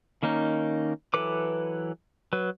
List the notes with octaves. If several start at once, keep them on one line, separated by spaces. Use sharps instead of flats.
D#3 A#3 C#4 D#4
E3 F#3 A4 B4 D6
F#3 B4